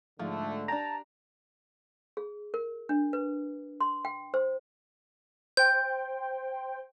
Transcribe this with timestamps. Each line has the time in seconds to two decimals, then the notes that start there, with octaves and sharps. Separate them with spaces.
0.19 G#2 D3 F3 A3
0.68 D4 G4 A5 A#5
2.17 G#4
2.54 A#4
2.89 D4
3.13 B4
3.80 C6
4.05 G5
4.34 C5
5.57 C5 G5 G6